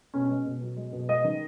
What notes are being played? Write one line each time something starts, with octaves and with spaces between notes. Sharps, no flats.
B2 C#4
C#4
G#3
B2
F#3
G#3
B2
G#3 D#5
D#3